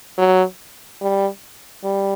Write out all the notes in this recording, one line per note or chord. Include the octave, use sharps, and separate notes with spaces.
F#3
G3
G3